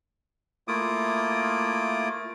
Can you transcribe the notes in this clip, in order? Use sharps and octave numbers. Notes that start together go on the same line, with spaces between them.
A3 A#3 E4 F4 D6 D#6